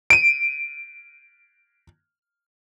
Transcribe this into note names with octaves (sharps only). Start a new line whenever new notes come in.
D7 D#7